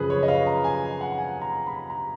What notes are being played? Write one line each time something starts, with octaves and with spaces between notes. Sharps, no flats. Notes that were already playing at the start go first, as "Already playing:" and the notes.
Already playing: F#2 C#3 F3 G#4 B4
C#5
D#5
F5
A#5
G#5
F#5
G#5
A#5
B5
A#5